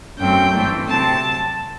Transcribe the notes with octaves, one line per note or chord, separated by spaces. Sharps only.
F#2 F#3 A3 C4 G5
G2 E3 A3 C4
C3 F#3 C4 A5